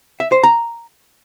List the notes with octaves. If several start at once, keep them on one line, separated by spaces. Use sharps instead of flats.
E5
C5
A#5